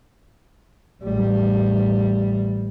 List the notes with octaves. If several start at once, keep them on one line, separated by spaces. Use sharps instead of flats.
A1 G3